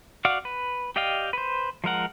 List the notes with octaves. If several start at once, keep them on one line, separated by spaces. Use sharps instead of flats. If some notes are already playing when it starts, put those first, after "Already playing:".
F#4 D5 F5 F#5
B4
G4 D5 D#5 F5 G5
B4 C5
F3 G#3 A#4 F#5